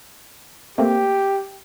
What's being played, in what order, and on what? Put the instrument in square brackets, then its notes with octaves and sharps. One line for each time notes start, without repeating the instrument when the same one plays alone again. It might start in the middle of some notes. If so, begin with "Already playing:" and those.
[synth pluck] A3 A#3 C4 [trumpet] G4